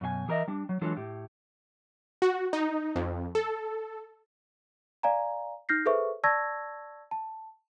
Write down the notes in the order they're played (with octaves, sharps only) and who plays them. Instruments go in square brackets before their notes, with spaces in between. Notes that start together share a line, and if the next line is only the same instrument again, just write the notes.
[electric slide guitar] F#2 B2 F4 G#5
E3 G#4 A#4 C#5 D#5 E5
G3 D4
F#3
E3 F#3 G#3 D4 F4 A4
A2 G4
[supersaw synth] F#4
D#4
F2
A4
[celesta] D5 F5 G#5 A#5
D#4 F6 G6 A#6 C7
G#4 A4 B4 C5 E5 C#6
D5 A5 C#6 E6 G#6 A#6
A5